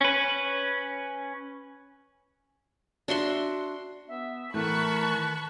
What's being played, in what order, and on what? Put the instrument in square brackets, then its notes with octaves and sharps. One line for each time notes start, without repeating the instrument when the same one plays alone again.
[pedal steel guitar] C#4 B4
[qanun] D4 F#4 E5 C6
[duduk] B3 [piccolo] E5
[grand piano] A2 E3 A3 [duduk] A#4 [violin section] A5 B5 C#6 [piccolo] F#6
[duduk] D#3